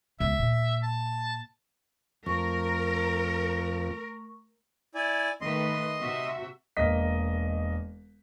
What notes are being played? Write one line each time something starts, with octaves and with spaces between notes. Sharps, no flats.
C#2 E5
A#2
A5
F2 A3 A#4 C#6
E4 D5 G#5
D#3 A3 B4 D#5 C6
C3 F#4 E5
E1 A#3 D#5 B6